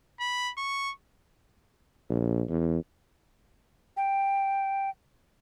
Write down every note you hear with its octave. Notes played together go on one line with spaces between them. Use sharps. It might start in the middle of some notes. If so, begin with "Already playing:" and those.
B5
C#6
A#1
E2
G5